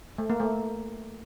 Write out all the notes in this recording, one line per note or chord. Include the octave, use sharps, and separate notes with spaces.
A3
A#3
A3